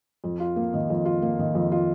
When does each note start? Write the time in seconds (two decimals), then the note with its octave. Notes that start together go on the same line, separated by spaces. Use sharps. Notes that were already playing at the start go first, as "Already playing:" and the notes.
0.24 F2
0.40 F4
0.56 A#3
0.74 D#3
0.90 F2
1.05 F4
1.22 A#3
1.39 D#3
1.55 F2
1.72 F4